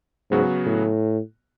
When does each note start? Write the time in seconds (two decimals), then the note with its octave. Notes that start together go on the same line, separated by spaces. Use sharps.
0.31 G#2 C#3 F#3 B3 F#4
0.66 A2